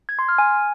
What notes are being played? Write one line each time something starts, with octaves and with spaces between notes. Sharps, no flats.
G#6
C6
F6
G#5